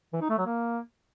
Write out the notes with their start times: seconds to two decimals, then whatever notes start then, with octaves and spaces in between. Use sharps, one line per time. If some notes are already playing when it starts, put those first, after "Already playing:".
0.13 E3
0.21 D#4
0.30 A3
0.38 F#3
0.46 A#3